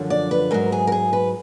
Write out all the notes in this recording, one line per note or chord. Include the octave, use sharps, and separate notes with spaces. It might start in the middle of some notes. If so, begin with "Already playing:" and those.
Already playing: F#2 D3 F3
D5
B4
G#2 F#3 A#4
G#4
A#4
G#4
B4